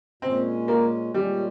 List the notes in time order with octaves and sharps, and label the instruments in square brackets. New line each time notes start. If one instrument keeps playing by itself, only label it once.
[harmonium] A#2 G#3 C#4 [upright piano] C4
[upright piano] A#3
[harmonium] A#2 G#3 C#4 [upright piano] G3